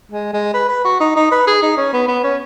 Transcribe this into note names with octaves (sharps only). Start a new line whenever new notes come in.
G#3
G#3
B4
B4
F#4
D#4
D#4
B4
G#4
D#4
C#4
B3
B3
C#4